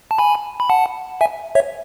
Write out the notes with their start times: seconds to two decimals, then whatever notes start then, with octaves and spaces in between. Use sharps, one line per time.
0.11 A5
0.18 G#5 B5
0.60 B5
0.70 F#5 A5
1.21 E5 G#5
1.55 C#5 E5